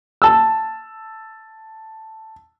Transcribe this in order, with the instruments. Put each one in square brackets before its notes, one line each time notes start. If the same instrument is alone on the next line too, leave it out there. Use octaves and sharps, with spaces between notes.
[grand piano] A5 E6